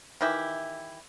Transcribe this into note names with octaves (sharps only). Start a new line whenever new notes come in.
D#3 E3 E4 G4